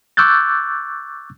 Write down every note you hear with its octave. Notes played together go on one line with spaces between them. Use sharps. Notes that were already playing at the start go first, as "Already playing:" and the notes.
C#6 D6 E6 F#6 G6 A6